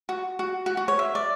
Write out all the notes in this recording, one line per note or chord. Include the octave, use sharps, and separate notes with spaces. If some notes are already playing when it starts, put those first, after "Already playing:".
F#4
F#4
F#4
F#4
C#5
E5
D5